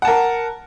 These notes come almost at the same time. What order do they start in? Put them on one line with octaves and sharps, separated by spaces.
F#5 A5 A#4